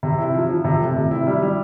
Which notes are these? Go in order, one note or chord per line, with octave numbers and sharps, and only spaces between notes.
C3
E4
F3
F3
C3
A3
C3
E4
G3
G3